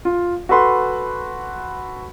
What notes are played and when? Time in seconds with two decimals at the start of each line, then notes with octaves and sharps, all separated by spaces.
0.05 F4
0.49 F#4 A4 B4 B5 C6